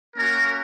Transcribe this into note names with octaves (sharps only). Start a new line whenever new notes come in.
A#3 C#4 F#4 A#4